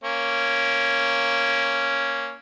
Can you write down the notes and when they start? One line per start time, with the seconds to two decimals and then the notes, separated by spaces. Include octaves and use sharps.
0.04 A#3 C#4